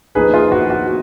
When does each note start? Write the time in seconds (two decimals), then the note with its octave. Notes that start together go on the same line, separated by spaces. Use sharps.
0.15 F3 A#3 D#4 G#4 B4
0.34 F4 G#4
0.52 F#4
0.70 F#4